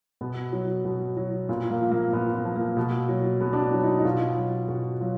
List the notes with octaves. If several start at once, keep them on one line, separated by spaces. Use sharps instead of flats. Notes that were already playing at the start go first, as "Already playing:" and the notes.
B2 B3
F#3
B2
F#3
A#2 B3
A#3
F3
A#3
A#2 B3
B3
F3
A#3
B2
F#3
B2 B3
D4
B3
F#3
D#4
D#4
B2 F4
F#3
B2 F#4
F#3 F4